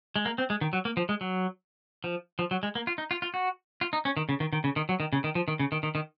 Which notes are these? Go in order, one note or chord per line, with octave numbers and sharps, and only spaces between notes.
G#3
A#3
C4
G#3
D#3
F#3
A#3
F3
G#3
F#3
F3
F3
F#3
G#3
A#3
F4
D#4
F4
F4
F#4
F4
D#4
C#4
D#3
C#3
D#3
D#3
C#3
D#3
F#3
D#3
C#3
D#3
F3
D#3
C#3
D#3
D#3
D#3